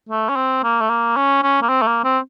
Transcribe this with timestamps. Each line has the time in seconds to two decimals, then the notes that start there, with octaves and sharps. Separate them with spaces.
0.09 A3
0.29 C#4
0.36 C4
0.64 A#3
0.81 A3
0.90 A#3
1.17 C#4
1.43 C#4
1.62 A#3
1.69 C4
1.82 A3
1.87 A#3
2.04 C4